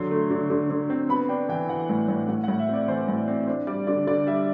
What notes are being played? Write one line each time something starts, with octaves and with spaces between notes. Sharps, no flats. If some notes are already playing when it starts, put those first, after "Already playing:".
Already playing: D3 F#3 C6
A3
D3
D3
D3
C4
B3 B5
D4 G5
E3 G5
E3 F#5
A2
A2
A2 F#5
F#5
A2
E5
C4 D5
E3 C5
A2
C4
D4 C5
G3 D5
D3 D5
D3 D5
G3 E5